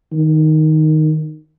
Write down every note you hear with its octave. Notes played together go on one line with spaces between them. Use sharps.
D#3